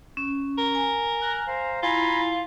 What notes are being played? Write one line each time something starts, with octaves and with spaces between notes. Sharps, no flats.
C#4
A#4
G#5
A#5 F6 F#6
C5 F5 A#5
E4 F4 G#5 A#5 B5